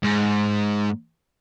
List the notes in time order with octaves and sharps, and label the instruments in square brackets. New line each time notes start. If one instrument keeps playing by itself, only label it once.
[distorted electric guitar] G#2